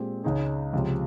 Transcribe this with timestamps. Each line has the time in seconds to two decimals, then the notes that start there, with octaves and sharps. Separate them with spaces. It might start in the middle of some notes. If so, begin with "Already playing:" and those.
Already playing: A#2 G#3 C4 G4
0.24 C#2 C#3 G#3 D#4 G#4
0.73 C#2 C3 F3